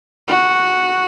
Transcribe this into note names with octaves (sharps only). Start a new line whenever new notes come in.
F#4